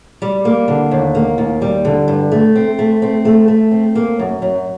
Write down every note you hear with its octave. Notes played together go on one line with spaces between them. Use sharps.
G3
A#3
D3
D#2
A#3
D#2
G3
D3
G2
A3
C4
A3
C4
A3
A3
C4
A#3
F#2
F#2